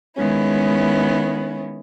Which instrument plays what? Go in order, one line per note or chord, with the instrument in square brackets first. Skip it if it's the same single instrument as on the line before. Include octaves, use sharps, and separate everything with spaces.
[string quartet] D#3 G#3 B3 C#4 E4